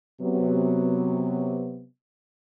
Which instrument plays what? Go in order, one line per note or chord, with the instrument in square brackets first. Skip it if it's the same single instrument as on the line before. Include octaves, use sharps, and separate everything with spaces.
[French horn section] C3 F#3 B3